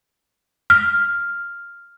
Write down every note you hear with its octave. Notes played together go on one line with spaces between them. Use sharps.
F6